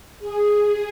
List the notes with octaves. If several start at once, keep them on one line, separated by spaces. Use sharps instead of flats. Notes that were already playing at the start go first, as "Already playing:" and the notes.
G#4